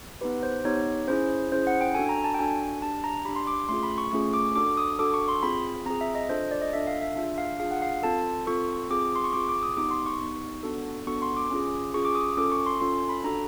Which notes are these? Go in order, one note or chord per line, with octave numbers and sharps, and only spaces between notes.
B3 D#4 G4 B4
C5
B3 D#4 G4 C#5
C#4 E4 G#4 C5
C#4 E4 G#4 C5
F#5
G5
D4 F#4 A4 G#5
A#5
A5
G5
D4 F#4 A4 G#5
D4 G4 A5
A#5
D4 G4 B5
C6
D6
A3 C#4 F4 G#4 C6
B5
C#6
A3 C#4 F4 G#4 C#6
D6
D4 F#4 A4 D6
D#6
D4 F#4 A4 D6
C#6
C6
C4 F4 G#4 B5
C4 F4 G#4 A#5
E5
D#5
D4 F4 A4 C5
D5
D#5
D4 F4 A4 E5
F5
E5
D4 F4 G#4 E5
F5
D4 F4 G#4 F5
F#5
F5
C4 F4 A4 A5
C4 F4 A4 C#6
C4 F4 G#4 D6
C6
C#6
C4 F4 G#4 D6
D6
D#6
B3 D#4 G4 D6
C6
C#6
B3 D#4 G4
B3 D4 F#4 A4
B3 D4 F#4 A4 C#6
C6
D6
C#4 F4 G#4
C#4 F4 G#4 C#6
D6
D#6
C#4 F4 A4 D6
C#6
C6
C#4 F4 A4 C6
B5
D4 F#4 A4 A#5